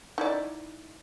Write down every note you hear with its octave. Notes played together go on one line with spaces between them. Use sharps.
D#4 E4 D5